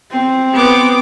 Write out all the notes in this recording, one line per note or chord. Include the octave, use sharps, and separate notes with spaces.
C4
B3 D6